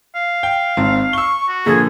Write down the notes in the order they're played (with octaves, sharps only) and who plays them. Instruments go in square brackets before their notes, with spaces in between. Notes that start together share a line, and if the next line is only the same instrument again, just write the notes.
[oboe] F5
[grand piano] G5
G#1 G#2 C4
[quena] C#6 [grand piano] E6 G7
[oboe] F#4
[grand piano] A#2 D3 F3 [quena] G#4